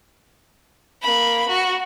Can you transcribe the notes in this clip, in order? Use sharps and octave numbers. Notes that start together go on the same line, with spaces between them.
A#3 B5
F#4